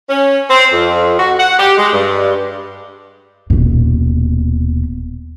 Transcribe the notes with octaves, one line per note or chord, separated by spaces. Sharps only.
C#4
C4
F2
F#4
F#5
G4
G#3
G2
D#1 B2